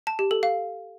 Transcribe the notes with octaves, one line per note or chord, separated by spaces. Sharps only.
A5
G4
A4
F5